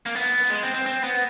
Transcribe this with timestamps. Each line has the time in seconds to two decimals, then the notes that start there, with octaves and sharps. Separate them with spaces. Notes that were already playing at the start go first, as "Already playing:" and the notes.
0.06 A#3
0.15 B3
0.50 G#3
0.63 C4
0.74 C4
0.86 C4
1.04 B3